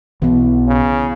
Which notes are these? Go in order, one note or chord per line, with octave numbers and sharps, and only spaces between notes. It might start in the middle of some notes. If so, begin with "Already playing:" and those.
B1 E3 B3
C#3